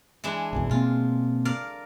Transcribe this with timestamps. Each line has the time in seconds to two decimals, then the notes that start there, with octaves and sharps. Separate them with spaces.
0.24 E3 G#3 D4
0.53 F1 B1 E2
0.71 B2 A#3 C4 F4
1.45 A#4 D5 F5